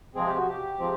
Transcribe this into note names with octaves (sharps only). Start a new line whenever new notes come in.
C3 F3 G#3 C4 G#4
G4
F#4
G4
C3 F3 G#3 C4